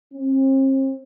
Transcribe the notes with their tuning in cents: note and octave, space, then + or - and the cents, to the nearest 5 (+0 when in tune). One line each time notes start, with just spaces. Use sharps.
C4 +40